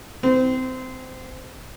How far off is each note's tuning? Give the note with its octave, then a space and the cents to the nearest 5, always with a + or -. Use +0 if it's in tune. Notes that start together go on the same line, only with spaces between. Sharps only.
C4 -25